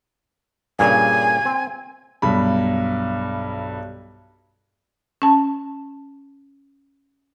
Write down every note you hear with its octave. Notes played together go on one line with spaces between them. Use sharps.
G2 A#2 C#3 G#5
C4
B1 G2 B5
C#4 A5